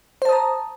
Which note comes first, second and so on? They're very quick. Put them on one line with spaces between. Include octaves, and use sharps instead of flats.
C5 A5 D#6 A#5